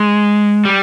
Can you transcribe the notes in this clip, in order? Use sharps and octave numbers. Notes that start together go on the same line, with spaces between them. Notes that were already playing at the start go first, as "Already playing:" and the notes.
Already playing: G#3
G3